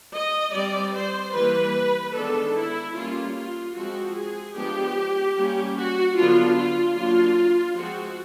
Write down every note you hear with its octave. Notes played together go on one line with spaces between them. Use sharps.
D#5
G3 C4 D5
C5
E3 G3 A#3 B4
D#3 G#3 B3 D4 A4
E4
G3 A#3 C#4 F4
F4
F3 G#3 C4 F#4
G#4
F3 G#3 B3 D4 G4
G3 A#3 C#4
F#4
D3 F#3 B3 D4 F4
F4
F#3 A#3 D4 F4
F3 G#3 C4 F#4